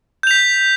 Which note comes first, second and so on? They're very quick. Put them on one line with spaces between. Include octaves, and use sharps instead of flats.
G6 F7 B6